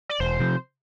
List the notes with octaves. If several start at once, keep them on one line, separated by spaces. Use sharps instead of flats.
D5
E1 C5
C3 F3